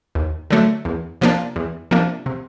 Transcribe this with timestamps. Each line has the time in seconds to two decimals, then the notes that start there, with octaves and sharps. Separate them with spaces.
0.15 D#2
0.50 D3 F#3 A3
0.85 E2
1.21 C3 F3 A#3 D4
1.56 E2
1.91 C3 F3 A#3 D4
2.26 C3